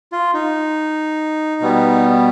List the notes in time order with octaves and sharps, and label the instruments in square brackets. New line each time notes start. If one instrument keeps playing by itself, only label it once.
[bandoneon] F4
D#4
B2 G3 B3